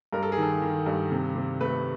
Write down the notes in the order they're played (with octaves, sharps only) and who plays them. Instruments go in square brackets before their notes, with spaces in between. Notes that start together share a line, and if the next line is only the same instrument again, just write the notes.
[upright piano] G2 A#4
A4
G#4
D#3 A4
D#3
G2
C3
C3
A3 B4